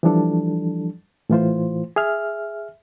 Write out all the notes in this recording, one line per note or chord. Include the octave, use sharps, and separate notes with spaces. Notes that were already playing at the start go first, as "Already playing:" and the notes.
E3 F3 G3 D4 A4
A2 E3 F4 C5
G#4 E5 F6